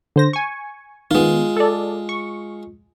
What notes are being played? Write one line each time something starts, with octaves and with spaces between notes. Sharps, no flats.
D3 C5 A#6
G#5 C#6
D#3 G#3 B3 F4
A4 D5
C#6